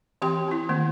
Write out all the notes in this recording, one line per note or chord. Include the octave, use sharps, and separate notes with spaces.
E3 C4 G4 G5 C6
C4 E4
D#3 A3 A#3